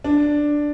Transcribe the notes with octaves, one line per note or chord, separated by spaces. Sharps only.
D4